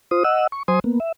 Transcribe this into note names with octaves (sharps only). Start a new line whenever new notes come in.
F4 C5 D#6
D#5 F#5 E6
C#6
F#3 C5 G#5 C6 D#6
A#3 B3
E5